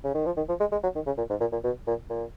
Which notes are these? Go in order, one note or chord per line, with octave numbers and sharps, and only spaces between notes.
C#3
D#3
F3
D#3
F3
G#3
G#3
F#3
D#3
C#3
A#2
G#2
A#2
A#2
B2
A#2
A#2